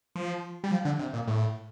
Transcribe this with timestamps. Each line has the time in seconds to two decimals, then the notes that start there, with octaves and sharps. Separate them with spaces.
0.16 F3
0.64 G3
0.71 F3
0.85 D3
0.99 C3
1.13 A#2
1.28 A2